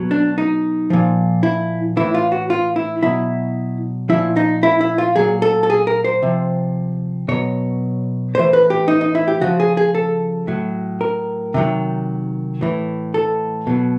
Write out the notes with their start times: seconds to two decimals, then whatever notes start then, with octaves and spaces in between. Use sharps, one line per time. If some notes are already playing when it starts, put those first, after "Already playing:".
Already playing: B2 F#3
0.11 D4
0.38 D#4
0.90 A#2 F3
1.43 E4
1.97 A2 E3 E4
2.14 F4
2.32 F#4
2.50 F4
2.76 E4
3.03 B2 F#3 E4
4.09 A#2 F3 E4
4.36 D#4
4.63 E4
4.81 E4
4.98 F4
5.16 A#2 F#3 G#4
5.42 A4
5.63 A4
5.70 G#4
5.87 A#4
6.04 C5
6.22 C3 F3
7.28 B2 F#3 C#5
8.35 A2 E3 C5
8.53 B4
8.70 G4
8.88 D#4
9.01 D#4
9.15 E4
9.28 G4
9.41 C#3 F3 F#4
9.60 G#4
9.77 G#4
9.95 A4
10.47 A2 F#3
11.01 A#4
11.54 C3 D#3 F#3
12.61 A2 E3
13.14 A4
13.67 B2 F#3